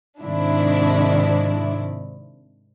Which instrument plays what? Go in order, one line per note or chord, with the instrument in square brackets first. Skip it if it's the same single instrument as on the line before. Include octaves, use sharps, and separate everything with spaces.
[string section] G#2 C3 D#3 D4 E4